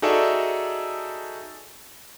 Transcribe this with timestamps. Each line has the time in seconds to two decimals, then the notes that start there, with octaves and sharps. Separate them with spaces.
0.02 D#4 F#4 G#4 A4 D5 E5